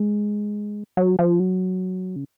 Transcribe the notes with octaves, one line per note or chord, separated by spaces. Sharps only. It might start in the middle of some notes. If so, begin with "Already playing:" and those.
Already playing: G#3
F#3
F3
F#3
C#3